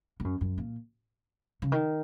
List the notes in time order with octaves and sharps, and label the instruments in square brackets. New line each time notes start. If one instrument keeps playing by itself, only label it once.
[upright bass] A2
F#2
F#2
A#2
C#3
D#3